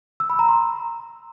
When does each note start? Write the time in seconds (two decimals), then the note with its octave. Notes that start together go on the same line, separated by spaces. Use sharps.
0.20 E6
0.30 B5
0.39 A#5
0.49 C6